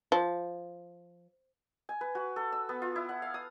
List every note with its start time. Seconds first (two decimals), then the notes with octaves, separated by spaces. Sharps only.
0.12 F3
1.89 G#5
2.01 B4
2.15 F#4
2.36 A4
2.52 E6
2.69 B3
2.82 F4
2.96 E4
3.09 F#5
3.22 F5
3.34 D#6